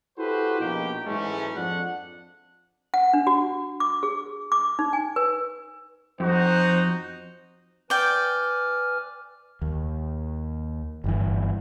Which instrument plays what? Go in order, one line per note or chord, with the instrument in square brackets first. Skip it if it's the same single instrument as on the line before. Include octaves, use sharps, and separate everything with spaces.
[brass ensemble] E4 F#4 G4 A4 B4 C5
A#1 B2 A#3 D#4 G4 G5
G#2 E3 F#3 G#3 A3 C#4
F2 D4 F#5
[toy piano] F#5
D4
F#4
D6
G#4
D6
D#4
G#5
B4
[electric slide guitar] F2 [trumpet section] D#4 F#4 [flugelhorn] C5
[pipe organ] B4 G#5 F6 [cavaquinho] D5 G5
[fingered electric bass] D#2
G1 G2 E3